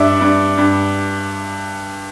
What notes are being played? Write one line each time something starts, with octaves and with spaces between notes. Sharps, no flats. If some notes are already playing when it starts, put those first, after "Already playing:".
Already playing: G2 D5 E5
G2
G2